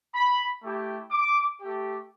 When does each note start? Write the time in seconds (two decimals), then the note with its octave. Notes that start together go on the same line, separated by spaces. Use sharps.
0.13 B5
0.62 A3 E4 G4
1.11 D6
1.61 A3 G4